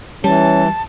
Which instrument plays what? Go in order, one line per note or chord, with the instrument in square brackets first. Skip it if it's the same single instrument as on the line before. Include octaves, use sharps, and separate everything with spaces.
[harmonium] E3 [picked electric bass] G3 [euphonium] C#4 [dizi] A5